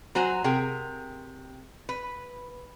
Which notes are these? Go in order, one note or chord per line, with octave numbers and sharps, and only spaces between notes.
F#3 F#4 C5 G#5 A#5
C3 G#4 A#4 G5
B4